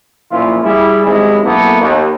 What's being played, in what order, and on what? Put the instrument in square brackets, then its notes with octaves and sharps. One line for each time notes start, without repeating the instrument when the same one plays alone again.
[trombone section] B1 A#2 F3 C#4 E4 F4
G3 E4 G#4
G#2 C3 D#3 G#3 C#4 E4
B1 F#2 A#3 B3 E4 A4
D#2